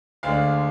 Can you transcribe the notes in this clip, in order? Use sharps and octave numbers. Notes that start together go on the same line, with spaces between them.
D2 D3 G#3 D4 F5